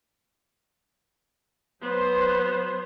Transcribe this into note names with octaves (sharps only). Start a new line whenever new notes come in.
F#3 B3 C5